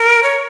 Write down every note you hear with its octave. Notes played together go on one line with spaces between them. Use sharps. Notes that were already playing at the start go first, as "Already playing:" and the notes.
Already playing: A#4
C#5